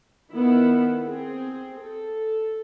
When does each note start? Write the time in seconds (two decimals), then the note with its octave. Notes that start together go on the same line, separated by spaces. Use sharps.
0.33 D#3 B3 E4
1.03 C4 G#4
1.81 A4